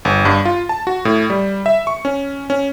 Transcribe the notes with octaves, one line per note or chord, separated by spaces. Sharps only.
G1
G2
F4
A5
F#4
A2
G3
E5
C#6
C#4
C#4